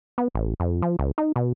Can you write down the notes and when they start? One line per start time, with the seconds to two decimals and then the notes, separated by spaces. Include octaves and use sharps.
0.18 B3
0.35 A1
0.60 F2
0.82 F3
0.99 C#2
1.18 D#4
1.36 B2